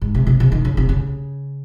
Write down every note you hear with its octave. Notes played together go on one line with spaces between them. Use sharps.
G#2
C3
C3
C3
D#3
C#3
C3
C#3